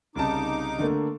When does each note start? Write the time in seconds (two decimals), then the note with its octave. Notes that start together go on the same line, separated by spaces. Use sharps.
0.16 C2 C#3 D#4 A5 D6
0.78 D3 A3 A#3